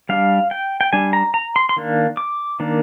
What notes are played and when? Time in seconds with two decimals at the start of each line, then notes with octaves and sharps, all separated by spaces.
0.09 G3 D4 F5
0.51 G5
0.81 G5
0.93 G3 D4 G#5
1.13 A#5
1.34 A#5
1.56 C6
1.69 C6
1.77 D#3 A#3 D4
2.17 D6
2.60 D#3 A#3 D4